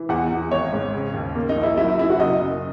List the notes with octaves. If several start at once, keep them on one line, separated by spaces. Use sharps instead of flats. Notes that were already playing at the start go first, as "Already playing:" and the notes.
Already playing: E3
E2 F#5
E2
G#1 C#5
G#2
C#3
D#2
A#3
D#4
A#1
E4
F#3 E4
E4
F#2 E4
F#4
F#1 D#5
F#2